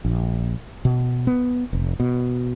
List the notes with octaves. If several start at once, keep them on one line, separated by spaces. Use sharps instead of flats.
A#1
B2
B3
F1
B2